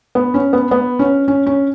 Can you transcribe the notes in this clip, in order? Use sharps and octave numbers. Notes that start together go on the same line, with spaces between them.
B3
C#4
B3
B3
C#4
C#4
C#4